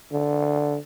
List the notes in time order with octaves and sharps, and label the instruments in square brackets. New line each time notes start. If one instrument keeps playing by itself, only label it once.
[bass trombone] D3